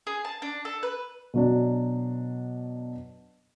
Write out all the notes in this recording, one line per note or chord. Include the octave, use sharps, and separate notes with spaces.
G#4
A5
D4
A4
B4
B2 F#3 D4